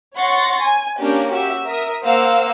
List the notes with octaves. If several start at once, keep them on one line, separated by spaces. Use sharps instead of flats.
C#5 F#5 C6 C#6 A6 A#6
G#5
A#3 C#4 D4 G4 A#4
F#4 G4 E5 E6
A#4 E5 D#6
A#3 C5 F5 F#5 E6